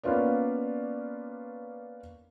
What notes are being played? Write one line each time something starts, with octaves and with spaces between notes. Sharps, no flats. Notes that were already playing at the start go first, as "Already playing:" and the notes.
A#3 B3 C#4 F4 B4 D5